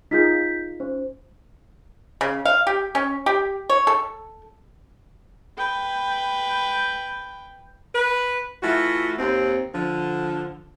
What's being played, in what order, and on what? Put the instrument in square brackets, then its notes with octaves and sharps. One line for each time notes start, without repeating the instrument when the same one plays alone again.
[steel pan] D#4 F4 G#4 [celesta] G6 B6
[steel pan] C#4 [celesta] C5
[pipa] C#3
F5
G4
C#4
G4
C#5
A4
[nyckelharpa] B4 G5
[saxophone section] B4
E3 A3 F4 F#4
D#2 C4
D3 F3